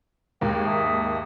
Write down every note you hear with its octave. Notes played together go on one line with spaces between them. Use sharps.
D#2 G#2 A#3 G5
E5 A5 D#6